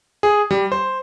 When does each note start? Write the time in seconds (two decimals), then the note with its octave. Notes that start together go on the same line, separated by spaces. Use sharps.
0.23 G#4
0.51 G3
0.72 C5